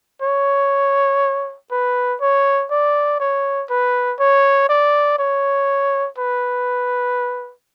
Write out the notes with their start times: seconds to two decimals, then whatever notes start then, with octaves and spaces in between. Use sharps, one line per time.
0.22 C#5
1.71 B4
2.21 C#5
2.71 D5
3.20 C#5
3.70 B4
4.20 C#5
4.69 D5
5.19 C#5
6.18 B4